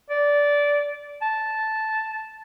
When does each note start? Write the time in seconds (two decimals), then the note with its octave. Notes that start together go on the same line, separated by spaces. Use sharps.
0.10 D5
1.22 A5